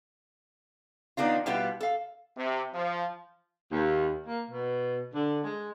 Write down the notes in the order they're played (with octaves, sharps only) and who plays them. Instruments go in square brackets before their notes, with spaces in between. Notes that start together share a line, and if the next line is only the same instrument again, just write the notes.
[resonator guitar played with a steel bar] D#3 B3 D4 D#4 F4
B2 G3 B3 E4 F4 G4
A4 F5
[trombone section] C3
F3
[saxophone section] D#2
A#3
B2
D3
G#3